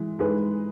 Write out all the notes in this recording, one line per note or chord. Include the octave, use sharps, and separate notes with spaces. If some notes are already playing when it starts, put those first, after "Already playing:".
Already playing: E3 G#3
G#3 D#4 G#4 B4